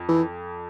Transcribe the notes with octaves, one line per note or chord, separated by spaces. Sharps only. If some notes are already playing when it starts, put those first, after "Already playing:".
Already playing: F2
E3